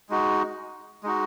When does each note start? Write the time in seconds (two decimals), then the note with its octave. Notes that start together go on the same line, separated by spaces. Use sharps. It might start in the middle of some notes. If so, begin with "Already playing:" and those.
0.10 G#3 D#4 F#4
1.03 G#3 D#4 F#4